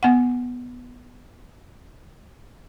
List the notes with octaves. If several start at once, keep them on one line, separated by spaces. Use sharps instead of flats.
B3 F#5